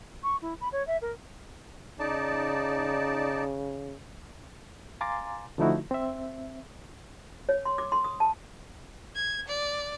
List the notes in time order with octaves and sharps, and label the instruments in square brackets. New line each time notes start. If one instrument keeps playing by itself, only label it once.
[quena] C#6
E4
B5
C#5
E5
A#4
[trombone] C#3 [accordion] D#4 D5 A5
[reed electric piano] F5 G#5 A#5 C6 D6 A6
D3 F3 A3 D#4 E4 F#4
C4 E5
[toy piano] C#5
C6
D6
C6
D#6
A5
[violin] G#6
D5